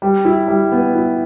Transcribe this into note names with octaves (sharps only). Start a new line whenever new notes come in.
G3
E4
G3
B3
E4